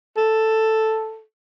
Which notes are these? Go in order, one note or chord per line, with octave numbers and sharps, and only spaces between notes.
A4